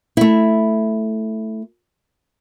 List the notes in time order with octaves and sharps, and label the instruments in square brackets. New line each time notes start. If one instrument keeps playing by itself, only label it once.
[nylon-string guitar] A3 E4